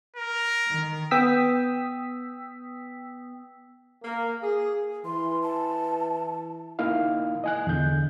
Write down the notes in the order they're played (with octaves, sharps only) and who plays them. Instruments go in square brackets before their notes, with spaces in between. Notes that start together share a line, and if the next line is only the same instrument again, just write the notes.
[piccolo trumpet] A#4
[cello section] D#3
[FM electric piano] B3 G5 D#6 E6 B6
[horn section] A#3
G#4
[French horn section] E3 [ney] C6
[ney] A5
[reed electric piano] A#3 D#4 E4 F5
D#5 G#5 F#6
E2 D3 G6